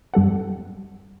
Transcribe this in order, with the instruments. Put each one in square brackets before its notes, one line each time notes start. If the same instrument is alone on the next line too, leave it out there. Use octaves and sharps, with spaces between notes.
[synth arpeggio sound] G2 G3 A4 F#5